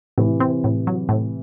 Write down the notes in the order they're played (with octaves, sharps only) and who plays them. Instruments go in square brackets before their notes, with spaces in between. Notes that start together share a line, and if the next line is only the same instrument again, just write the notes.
[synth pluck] A2 [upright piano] C3 E3
[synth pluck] C4
A2
F#3
A2